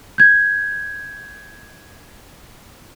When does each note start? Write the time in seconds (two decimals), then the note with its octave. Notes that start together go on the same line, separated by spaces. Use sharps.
0.18 G6 G#6